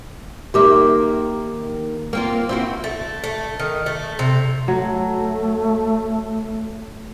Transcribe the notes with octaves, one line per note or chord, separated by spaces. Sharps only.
D#3 A#3 G4 E5 D6
A#3 C4 F4
C4 E4 F#4
A3
A3
D#3
A3
C3
F#3 A3